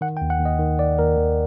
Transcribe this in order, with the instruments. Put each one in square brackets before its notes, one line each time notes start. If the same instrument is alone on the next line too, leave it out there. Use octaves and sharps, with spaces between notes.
[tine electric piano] D#3 F#5
G5
D#2
F#5
D#2
D#5
D#3
D#3 D5
D#2 A#4
D#2